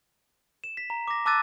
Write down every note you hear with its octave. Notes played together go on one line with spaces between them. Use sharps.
E7
B6
A#5
D6 A#6
A5 D6 E6 F#6 A6 D#7